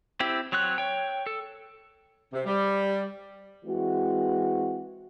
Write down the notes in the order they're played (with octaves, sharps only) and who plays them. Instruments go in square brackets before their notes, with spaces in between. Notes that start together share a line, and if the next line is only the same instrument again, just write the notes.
[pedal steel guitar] C4 E4 G4
F#3 C4 C#5 F#6
C#5 G5
A4
[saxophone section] C3
G3
[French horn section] E3 G#3 C4 F#4